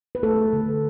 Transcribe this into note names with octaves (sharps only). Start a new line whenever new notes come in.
B4
A3 A4
A3
D3
D3